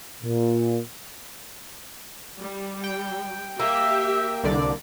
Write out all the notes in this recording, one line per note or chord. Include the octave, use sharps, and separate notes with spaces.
A#2
G3
G5
A#3 G4 E5 E6
C2 D3 D5